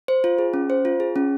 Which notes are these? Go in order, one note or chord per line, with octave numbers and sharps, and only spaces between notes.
C5
F4
G#4
C#4
C5
F4
G#4
C#4